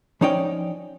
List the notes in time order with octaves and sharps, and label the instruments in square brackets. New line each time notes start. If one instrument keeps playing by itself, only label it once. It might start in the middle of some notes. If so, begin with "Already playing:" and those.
[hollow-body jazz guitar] F3 C#4 D#4 C#5 D5 G5